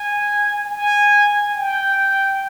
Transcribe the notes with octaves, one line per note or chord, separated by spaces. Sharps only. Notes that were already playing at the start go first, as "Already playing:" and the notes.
Already playing: G#5
G#5
G5